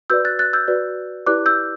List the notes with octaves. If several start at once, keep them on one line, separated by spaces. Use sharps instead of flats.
F#4 B4 D5 E6 G6
F#6 A6
F#6 A6
E6 G6
F#4 B4 D5
E4 G4 B4 D5 D6 F#6
E6 G6